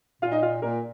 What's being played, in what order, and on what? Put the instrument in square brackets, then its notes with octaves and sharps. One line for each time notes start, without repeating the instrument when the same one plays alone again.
[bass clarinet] A#2 [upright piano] F4 F5
[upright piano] D#4 D#5
F4 F5
[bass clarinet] A#2 [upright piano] A#3 A#4